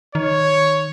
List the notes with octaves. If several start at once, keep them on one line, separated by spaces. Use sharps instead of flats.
D#3 C#5